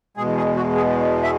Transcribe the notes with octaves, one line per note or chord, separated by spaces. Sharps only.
E2 B2 G#3 G#4
G#4
F#4
G#4
E5